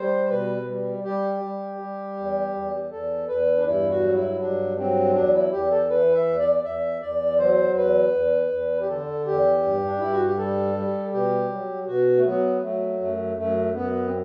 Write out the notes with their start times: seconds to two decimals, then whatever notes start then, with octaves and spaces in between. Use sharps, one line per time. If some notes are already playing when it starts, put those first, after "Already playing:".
Already playing: G3 C5
0.29 B2 B4
0.67 G3
1.04 G3 G4
1.41 G3
1.78 G3
2.16 E2
2.53 E2
2.90 E2 A4
3.28 E2 B4
3.56 D4
3.65 G2 E4
3.90 F#4
4.02 F#3
4.15 E4
4.40 G2 D4
4.77 F#3 C4
5.14 E2 D4
5.33 E4
5.52 E2 G4
5.71 A4
5.89 E3 B4
6.14 E5
6.27 E2
6.39 D5
6.64 E2 E5
7.01 E2 D5
7.38 F#3 C5
7.76 E2 B4
8.13 E2
8.50 E2
8.81 G4
8.88 D3 A4
9.25 E2 G4
9.63 G2
9.86 D4
9.99 G2 E4
10.12 F#4
10.25 G4
10.37 G3 A4
10.75 G3
11.12 B2 G4
11.50 F#3
11.87 B2 F#4
12.17 A3
12.24 F#3 B3
12.62 F#3 A3
12.99 F#2 A3
13.36 F#2 A3
13.74 F#2 B3
14.06 C4